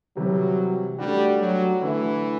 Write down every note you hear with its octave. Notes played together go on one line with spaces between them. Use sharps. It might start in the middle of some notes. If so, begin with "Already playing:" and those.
C3 E3 F#3 G3
G3 A3 D4 F#4
F#3
D3 E3 A3 E4